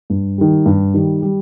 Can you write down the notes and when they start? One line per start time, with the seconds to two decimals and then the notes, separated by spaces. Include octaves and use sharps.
0.10 G2
0.38 D#3 G3
0.66 G2
0.94 D#3 G3
1.22 G3